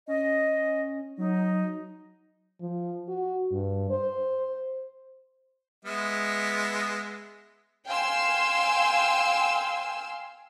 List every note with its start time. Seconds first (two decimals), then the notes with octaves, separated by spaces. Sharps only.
0.08 C#4 D#5
1.18 F#3 D#4
2.61 F3
3.08 F#4
3.51 G2
3.90 C5
5.85 G#3 B3 E5
7.87 F5 G5 G#5 C6 E6